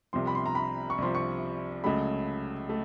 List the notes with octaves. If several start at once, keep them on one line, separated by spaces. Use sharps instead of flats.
C2 C3 F3 C6
B5
C6
A#5
B5
C#6
C2 C3 F3 C6
C#6
C#2 C#3 F#3 A3 B5
A3